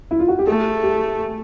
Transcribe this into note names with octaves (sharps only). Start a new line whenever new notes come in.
E4
F4
F#4
G4
A3 G#4
G4